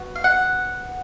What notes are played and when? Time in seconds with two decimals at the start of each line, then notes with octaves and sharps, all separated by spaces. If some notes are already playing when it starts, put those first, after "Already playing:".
Already playing: B3 F#4
0.15 F5
0.24 F#5